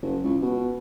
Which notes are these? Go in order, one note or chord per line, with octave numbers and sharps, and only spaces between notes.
F#1
C#2
B2